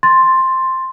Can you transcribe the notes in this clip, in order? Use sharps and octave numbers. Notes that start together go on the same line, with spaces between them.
C6 A6